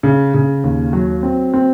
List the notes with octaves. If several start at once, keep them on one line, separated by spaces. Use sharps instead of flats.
C#3
C#3
D#2
F#3
C4
C4